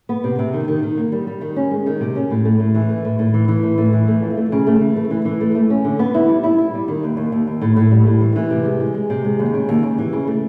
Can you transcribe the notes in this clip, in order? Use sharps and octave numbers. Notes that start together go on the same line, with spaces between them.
B3
C3
C3
D#3
D#3
D#3
A#3
G3
G3
D#3
C#4
G#3
D#3
C3
C#4
A2
A3
A2
E3
A3
A2
A2
E3
E3
A2
A2
E3
A3
F2
A3
C#3
A3
E3
A3
E3
E3
A3
A3
C#4
D3
B3
E4
G3
E4
E4
G3
D#3
D#2
D#2
D#2
D#2
A2
A2
G3
A2
E3
E3
C3
G#3
G#3
G#3
C3
G#3
D#2
C#3
D#2
C#3
E3
C#3
A3